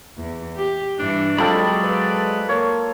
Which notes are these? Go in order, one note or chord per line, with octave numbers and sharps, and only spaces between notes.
E2
G4
G2 E3 D4
F#3 G#3 C4 F4 A4 D5 B5
B4
A#3 C#5